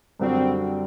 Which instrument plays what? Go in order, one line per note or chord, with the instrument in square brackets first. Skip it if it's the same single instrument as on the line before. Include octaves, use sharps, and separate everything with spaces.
[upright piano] F#2 D3 G3 D4 F#4 [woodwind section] C4